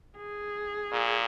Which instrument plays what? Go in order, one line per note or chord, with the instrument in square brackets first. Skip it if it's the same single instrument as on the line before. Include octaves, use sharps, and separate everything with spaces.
[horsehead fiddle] G#4
[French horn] A#2